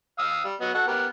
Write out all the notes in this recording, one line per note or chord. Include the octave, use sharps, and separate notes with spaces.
F5 D#6 E6
G3
F#3 B3 D#5
F#4 A4
B3 G4 A#4